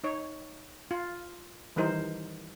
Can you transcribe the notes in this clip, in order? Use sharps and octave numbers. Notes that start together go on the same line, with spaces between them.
D#4 C#5
F4
D#3 E3 G3 D#4 A#4 C5